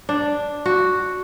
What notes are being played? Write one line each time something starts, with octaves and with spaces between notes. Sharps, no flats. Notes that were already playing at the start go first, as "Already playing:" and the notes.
D4
F#4